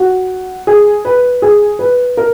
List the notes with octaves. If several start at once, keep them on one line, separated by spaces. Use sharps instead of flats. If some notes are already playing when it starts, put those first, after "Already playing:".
Already playing: F#4
G#4
B4
G#4
B4
A#4